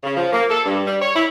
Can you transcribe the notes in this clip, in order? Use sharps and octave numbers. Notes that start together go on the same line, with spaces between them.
C#3
F3
A#3
A4
G2
G3
C#5
E4